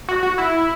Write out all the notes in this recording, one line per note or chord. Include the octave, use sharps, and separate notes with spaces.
F#4
F#4
E4